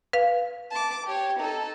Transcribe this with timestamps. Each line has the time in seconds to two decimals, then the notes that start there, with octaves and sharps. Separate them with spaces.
0.13 B4 F5
0.71 A5 D6
1.07 G4 C#5
1.40 D#4 A4